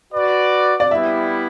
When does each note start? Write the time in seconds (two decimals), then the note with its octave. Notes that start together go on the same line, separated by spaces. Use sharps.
0.12 F#4 B4 D5
0.80 D5
0.91 G3 B3 E4 E5